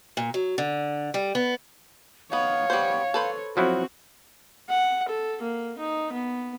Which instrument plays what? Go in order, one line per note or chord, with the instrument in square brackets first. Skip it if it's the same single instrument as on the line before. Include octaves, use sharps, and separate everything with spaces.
[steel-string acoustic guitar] A#2
F#3
D3
G3
B3
[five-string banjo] B3 D#4 [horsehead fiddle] C#5 [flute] F5
[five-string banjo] G3 B3 C5
A4 B4 C5
[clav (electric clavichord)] F3 F#3 E4 [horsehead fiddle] C4 F#4
[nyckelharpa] F#5
A4
A#3
D#4
B3